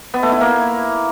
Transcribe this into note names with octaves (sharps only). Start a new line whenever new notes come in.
B3
A3
E4
A#3